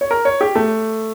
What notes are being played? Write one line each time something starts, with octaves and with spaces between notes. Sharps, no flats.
C#5
A#4
C#5
G4
A3